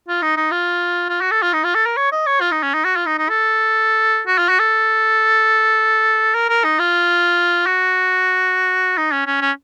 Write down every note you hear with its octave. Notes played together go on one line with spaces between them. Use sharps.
F4
D#4
D#4
F4
F4
F#4
A4
F4
D#4
F4
A4
A#4
C#5
D#5
C#5
F4
D#4
C#4
D#4
F#4
F4
D#4
D#4
A4
F#4
F4
F#4
A4
A#4
A#4
D#4
F4
F#4
D#4
C#4
C#4
C#4